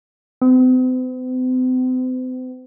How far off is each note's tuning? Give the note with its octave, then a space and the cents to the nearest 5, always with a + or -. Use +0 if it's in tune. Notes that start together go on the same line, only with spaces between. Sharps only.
C4 -45